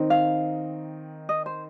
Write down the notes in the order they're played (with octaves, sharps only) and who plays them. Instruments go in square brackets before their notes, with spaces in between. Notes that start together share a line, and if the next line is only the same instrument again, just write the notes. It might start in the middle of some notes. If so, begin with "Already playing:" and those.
Already playing: [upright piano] D#3 C4 D#4
[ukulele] F5
D#5
C5